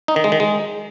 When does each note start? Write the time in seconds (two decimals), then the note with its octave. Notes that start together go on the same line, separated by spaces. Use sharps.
0.08 D#4
0.16 D#3
0.24 G#3
0.32 D#3
0.40 G#3